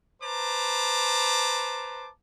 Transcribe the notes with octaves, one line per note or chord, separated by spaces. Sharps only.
B4 C5 A5 A#5 D6